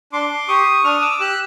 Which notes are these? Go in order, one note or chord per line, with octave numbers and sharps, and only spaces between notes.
D4 C6 D6
G4 C#6 D#6
D4 D#6 F6
D6 E6
G4 E6 F#6